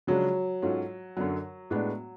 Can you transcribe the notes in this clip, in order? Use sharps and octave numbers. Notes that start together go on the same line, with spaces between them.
C#3 F3 F#3 G#3 D4 G#4
G#2 F#3 C#4 F4 A4
F#2 D3 F#3
A2 G#3 B3 D4